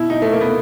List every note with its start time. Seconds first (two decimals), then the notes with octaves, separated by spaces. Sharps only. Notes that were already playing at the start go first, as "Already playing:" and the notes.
Already playing: B2 E4
0.10 D#4
0.22 A3
0.32 A#3
0.41 B3